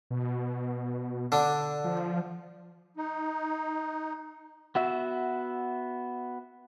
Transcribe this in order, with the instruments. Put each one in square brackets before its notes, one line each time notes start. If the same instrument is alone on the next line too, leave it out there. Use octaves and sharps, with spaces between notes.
[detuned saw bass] B2
[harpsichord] D3 D4
[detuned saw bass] F3
[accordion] D#4
[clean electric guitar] B3 F#4 E5